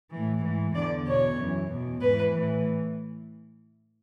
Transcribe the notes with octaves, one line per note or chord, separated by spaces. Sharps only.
A2 E3
G#2 E3
E2 D3 D5
E2 B2 C#5
F#2 E3
E2 B2
G#2 E3 B4
A2 E3